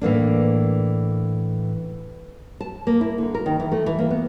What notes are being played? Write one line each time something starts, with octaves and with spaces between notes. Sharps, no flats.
A2 E3 A#3 D4
A5
A#3
E4
D3
A#4
D#3
E3
A3
E3
A#3
B3